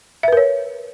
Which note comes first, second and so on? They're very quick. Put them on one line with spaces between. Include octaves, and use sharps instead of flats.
E5 B4 A#4 C#5